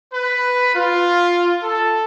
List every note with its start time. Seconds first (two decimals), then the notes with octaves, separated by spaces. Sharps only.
0.14 B4
0.75 F4
1.63 A4